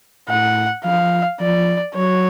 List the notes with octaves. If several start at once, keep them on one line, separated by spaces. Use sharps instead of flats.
A2 F#5
F3 F5
F3 D5
F#3 C#5